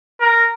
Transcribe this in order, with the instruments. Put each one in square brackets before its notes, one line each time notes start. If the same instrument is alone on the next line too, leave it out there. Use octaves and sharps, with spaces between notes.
[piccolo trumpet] A#4